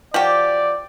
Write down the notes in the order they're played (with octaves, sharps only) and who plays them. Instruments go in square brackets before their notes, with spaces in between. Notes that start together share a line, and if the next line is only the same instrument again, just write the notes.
[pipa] F3 F#4 G4 [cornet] D5